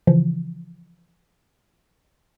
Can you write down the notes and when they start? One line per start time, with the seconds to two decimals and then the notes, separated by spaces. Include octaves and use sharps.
0.07 C#3 E3 F3